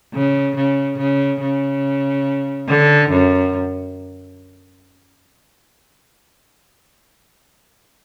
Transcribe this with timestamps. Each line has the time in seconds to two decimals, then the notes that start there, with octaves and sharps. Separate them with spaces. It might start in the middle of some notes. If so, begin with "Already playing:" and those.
0.13 C#3
0.56 C#3
0.98 C#3
1.41 C#3
2.68 D3
3.11 F#2